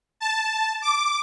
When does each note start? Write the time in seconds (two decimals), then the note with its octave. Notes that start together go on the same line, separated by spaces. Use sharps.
0.20 A5
0.82 D6